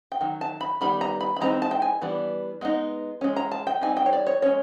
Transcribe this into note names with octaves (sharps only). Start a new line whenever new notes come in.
G5
D#3 F#3
A5
B5
D#3 G3 B3 B5
A#5
B5
B5
E3 G#3 C4 D#4 A#5
A5
G5
G#5
E3 G3 B3 D4
G#3 B3 D#4
G#3 C#4
A#5
A5
G5
G3 C4 D#4 G#5
G5
C#5
D5
C#5
G#3 C#4 C#5